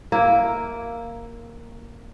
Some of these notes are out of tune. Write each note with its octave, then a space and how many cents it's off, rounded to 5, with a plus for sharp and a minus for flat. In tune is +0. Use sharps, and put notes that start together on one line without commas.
A#3 +0 E4 +0